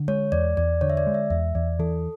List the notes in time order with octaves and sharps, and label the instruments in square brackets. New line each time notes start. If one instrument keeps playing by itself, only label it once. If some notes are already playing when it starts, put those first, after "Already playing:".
Already playing: [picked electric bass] D3
[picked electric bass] G#3 [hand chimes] C#5
[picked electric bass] E2 [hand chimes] D5
[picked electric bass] E2 [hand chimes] D5
[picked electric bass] D3 [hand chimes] C#5
[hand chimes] E5
D5
[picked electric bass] G#3
[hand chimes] E5
[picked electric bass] E2 [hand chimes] E5
[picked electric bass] E2 [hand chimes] D5
[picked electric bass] E3 [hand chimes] A4